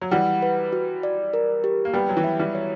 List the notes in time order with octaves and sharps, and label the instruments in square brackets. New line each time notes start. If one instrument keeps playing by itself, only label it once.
[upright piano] F#3
[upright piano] E3 G3 [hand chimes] F#5
[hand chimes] B4
F#4
D5
A#4
G4
[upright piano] A#3
[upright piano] G3 B3 [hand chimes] G5
[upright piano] F#3
E3
[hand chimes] E5
[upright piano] E3 G3
[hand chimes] C#5